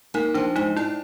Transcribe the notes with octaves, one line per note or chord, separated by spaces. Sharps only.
A#3 D#4
F3 D4
G#2 D#4
D4 E4